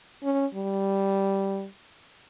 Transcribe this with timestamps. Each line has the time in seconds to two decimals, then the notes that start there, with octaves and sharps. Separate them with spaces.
0.23 C#4
0.54 G3